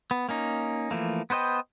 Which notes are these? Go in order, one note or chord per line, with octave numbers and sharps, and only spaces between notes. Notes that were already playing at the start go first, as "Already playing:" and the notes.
B3
A#3 C#4 D#4
E3 F3 A3 A#3
B3 B4 C5 D#5 G5